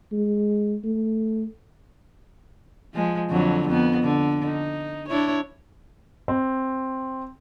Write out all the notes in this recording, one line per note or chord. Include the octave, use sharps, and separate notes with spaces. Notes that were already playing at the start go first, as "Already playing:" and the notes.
G#3
A3
F3 G#3
F2 D3 F#3
F2 B3
D3
D#4
D4 E4 C#5
C4